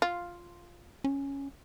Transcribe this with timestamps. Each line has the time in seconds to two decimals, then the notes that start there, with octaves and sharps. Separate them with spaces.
0.02 F4
1.04 C#4